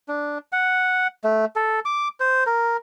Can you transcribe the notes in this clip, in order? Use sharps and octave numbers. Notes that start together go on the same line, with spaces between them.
D4
F#5
A3
A4
D6
C5
A#4